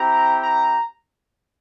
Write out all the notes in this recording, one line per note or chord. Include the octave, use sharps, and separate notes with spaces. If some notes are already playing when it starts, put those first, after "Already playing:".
Already playing: C4 E4 G4 A#5
A#5